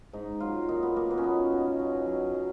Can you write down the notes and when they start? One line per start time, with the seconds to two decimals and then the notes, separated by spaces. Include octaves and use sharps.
0.13 G#2 D#4
0.40 F#3 F4
0.69 A#2 D#4
0.83 B3
0.96 A#2 A#3
1.11 B3
1.18 C#4
1.23 B2 D#4
1.52 B2
1.79 F#3
2.06 F#3
2.34 F#3